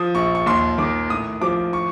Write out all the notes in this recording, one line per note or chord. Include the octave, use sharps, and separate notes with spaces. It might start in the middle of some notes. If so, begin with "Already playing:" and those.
Already playing: F3 D#6
A#1 C#6
C#6
D#2 C6
D#3 D6
A2 D#6
F3 D6
C#6